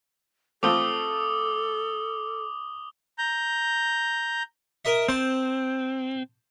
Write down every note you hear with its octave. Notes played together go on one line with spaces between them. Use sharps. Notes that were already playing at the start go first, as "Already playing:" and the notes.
A3 C4 F4 A4 D6 D#6 G7
A#5 G6
A#4 D#5 E5
C4 C5 A5 C6